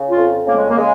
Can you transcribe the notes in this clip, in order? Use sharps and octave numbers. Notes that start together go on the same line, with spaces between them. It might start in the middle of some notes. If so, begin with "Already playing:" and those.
Already playing: C#3
F4
F2
C#3 A#3
G#3
A#3
C#3 G#3